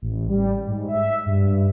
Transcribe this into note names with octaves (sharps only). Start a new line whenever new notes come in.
A1
G3
G#2
E5
G2